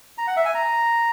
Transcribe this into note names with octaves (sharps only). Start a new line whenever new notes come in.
A#5
F#5
E5
G#5
A#5